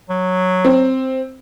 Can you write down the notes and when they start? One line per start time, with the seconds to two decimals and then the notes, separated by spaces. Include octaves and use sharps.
0.10 F#3
0.65 C4